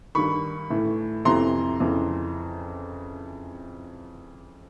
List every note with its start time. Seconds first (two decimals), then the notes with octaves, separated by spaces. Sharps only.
0.15 G2 D#3 B5 C#6
0.70 A2 E3
1.25 F2 C3 E3 A#5 C6
1.80 F2 C#3 E3